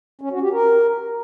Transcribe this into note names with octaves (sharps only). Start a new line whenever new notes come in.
C#4
F#4
G4
A#4